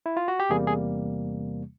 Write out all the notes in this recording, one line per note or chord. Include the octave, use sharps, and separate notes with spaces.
E4
F4
F#4
G4
E2 C3 E3 G3 A#3 G#4
G#4